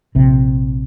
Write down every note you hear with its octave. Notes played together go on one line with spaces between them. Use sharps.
A#1 C3